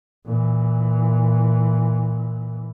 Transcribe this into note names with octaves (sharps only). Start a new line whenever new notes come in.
A#2 E3